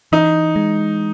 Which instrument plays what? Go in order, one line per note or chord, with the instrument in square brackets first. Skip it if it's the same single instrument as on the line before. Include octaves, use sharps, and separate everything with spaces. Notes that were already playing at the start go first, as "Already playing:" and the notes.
[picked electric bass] E3 [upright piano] D#4
[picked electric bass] G#3